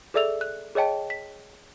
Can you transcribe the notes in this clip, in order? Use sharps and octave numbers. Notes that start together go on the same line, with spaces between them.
G#4 A4 D5 E5 E6 F7
F#6
G#4 C#5 D#5 G5 A5
B6